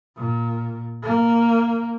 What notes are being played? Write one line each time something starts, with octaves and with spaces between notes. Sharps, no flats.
A#2
A#3